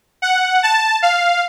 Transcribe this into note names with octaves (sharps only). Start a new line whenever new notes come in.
F#5
A5
F5